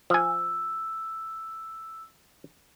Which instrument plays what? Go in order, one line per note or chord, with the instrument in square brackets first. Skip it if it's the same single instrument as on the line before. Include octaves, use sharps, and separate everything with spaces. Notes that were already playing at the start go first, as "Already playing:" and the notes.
[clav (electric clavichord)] F3 G#5 [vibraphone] E6